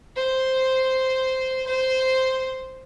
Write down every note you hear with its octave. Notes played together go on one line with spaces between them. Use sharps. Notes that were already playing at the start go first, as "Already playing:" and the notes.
C5
C5